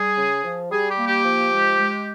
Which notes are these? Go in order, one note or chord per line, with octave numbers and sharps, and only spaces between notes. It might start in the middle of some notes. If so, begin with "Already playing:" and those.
Already playing: G3 G#4
C#3
F3
G3 G#4
G4
A#3
G4
F3
G#3
G#3